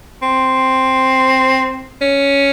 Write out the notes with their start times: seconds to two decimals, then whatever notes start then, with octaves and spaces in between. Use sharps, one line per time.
0.22 C4
2.01 C#4